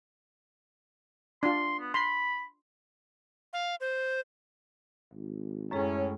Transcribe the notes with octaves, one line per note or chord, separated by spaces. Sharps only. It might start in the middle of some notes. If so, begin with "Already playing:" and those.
D4 F4 C6
B3
B5 C6
F5
C5
G#1
F#2 A2 G#3 C#4 G#4 C#5